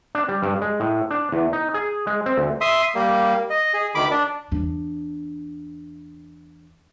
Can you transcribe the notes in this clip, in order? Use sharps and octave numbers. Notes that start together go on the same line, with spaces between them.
D4
G3
G2
G#3
A2
D4
E2
D#4
G#4
G#3
C4
D2
E5 C6 D#6
G3 A#3
D#5
G#4
D2 D#3 B5 D6
D4
E2 D4